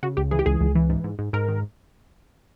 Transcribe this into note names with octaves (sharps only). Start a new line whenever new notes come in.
C#3 F#4
C#2 G4
E3 G#4
G4
C#2 G#4
C#2
E3
G#2
G#2
G#2
G#2 A#4
D#3